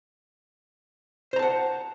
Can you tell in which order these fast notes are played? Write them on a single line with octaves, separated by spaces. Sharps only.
C5 A#5 A5 F#5